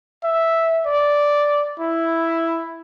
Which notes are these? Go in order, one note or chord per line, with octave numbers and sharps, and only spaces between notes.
E5
D5
E4